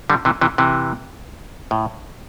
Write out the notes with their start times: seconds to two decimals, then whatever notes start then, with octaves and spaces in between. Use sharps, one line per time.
0.10 D3 G3
0.25 C3 E3
0.41 C3 E3
0.58 C3 E3
1.71 A2